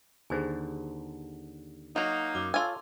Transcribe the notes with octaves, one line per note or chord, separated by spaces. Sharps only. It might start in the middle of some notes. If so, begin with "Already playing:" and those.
D#2 D3 G#4 C5 G#5
F#3 A#3 D#4 F#4
F#2 D6
F4 A4 C#5 F5 G#5 C6 E6